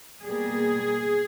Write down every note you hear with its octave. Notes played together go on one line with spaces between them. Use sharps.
B2 G3 A#3 G#4